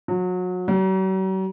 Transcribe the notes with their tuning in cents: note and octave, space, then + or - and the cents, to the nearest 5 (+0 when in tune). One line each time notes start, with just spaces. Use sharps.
F#3 -30
F#3 +45